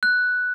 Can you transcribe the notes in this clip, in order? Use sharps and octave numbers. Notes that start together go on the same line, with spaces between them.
F#6